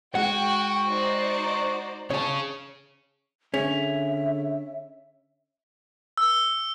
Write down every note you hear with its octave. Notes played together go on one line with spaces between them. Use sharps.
G#3 F#4 F#5 G5
D#4 C5 D5
C#3 C#4 C#5 A5
D3 C#4 G#4 E5 B6 F7
E6